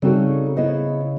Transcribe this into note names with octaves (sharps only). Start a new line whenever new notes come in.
C#3 G3 C4 D#4 F#4 A4
B3 E4 G#4 C5 D#5